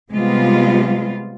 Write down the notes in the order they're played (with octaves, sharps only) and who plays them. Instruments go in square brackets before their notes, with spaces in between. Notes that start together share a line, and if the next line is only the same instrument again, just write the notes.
[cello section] C3 G3 G#3 B3 F4